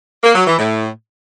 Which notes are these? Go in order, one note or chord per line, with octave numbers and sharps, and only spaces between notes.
A#3
F#3
E3
A2